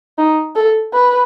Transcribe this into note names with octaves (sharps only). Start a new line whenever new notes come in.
D#4
A4
B4